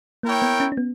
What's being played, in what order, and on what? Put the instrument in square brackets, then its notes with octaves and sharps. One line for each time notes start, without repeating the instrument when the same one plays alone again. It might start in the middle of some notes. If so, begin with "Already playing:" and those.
[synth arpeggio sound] A#3 [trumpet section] E4 A#4 C#5 G5
[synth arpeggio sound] B3
C#4
C#4
B3